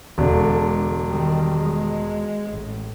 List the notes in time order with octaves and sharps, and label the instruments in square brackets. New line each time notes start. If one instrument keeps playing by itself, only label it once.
[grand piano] E1 [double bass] D3 G#3
[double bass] D#3 G3
G#3
A1